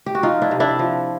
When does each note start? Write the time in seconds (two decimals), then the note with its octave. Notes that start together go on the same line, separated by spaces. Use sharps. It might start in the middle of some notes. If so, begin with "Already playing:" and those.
0.06 G4
0.15 F#4
0.23 F3 D#4 F4
0.42 D4 E4
0.51 C3
0.60 D4 E4
0.79 F3